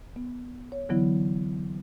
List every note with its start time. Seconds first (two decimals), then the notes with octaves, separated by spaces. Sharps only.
0.16 B3
0.72 C#5
0.89 D3 E3 F#3 B3 E4